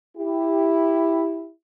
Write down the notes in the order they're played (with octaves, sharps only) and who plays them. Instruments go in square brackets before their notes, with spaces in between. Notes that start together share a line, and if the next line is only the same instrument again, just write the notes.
[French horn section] E4 G4